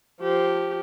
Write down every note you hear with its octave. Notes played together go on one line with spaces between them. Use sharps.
F3 G4